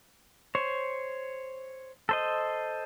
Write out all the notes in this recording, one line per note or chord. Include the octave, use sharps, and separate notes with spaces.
C5 C#5
A4 C5 D#5